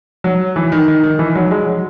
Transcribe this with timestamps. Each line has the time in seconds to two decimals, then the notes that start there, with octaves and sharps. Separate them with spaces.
0.24 F#3
0.56 E3
0.72 D#3
0.88 D#3
1.04 D#3
1.19 E3
1.35 F#3
1.51 G#3
1.67 F#3